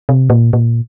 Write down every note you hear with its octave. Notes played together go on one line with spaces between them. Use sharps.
C3
A#2
A#2